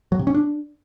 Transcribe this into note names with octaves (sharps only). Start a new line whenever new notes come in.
F#3
C3
C#4
D4